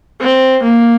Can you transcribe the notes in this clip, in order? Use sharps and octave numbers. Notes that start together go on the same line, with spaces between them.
C4
A#3